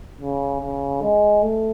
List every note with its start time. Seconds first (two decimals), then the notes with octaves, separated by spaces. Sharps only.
0.21 C#3
0.61 C#3
1.02 G#3
1.43 A3